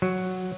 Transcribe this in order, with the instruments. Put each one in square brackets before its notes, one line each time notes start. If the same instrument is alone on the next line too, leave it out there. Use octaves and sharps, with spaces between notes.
[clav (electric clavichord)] F#3